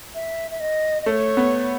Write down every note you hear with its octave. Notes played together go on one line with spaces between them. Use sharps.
E5
E5
D#5
D#5
A3 C#5
B3